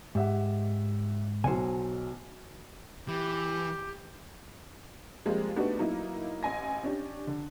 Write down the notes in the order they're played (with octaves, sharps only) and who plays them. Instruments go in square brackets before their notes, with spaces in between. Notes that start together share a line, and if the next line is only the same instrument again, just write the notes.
[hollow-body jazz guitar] G#2 [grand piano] G4 E5 F#5
[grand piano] B1 F#3 [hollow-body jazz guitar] C5 F#5 G#5
[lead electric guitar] E3 [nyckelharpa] G4
[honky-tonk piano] F3 G3 G#3 A#3 C4 F4
A3 B3 D4 D#4 F#4 G4
F#3 A#3 D#4 E4
A1 G#5 A#6
C#4 D4 G4
D3